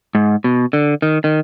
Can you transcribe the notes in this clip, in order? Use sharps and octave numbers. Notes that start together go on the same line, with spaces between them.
G#2
B2
D3
D#3
D#3